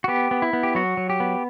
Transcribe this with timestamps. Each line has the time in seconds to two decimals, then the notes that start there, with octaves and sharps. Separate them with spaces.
0.04 F#4
0.08 B3 G4
0.31 B3
0.42 E4
0.53 B3
0.63 G4
0.75 F#3 F#4
0.97 F#3
1.10 G4
1.20 B3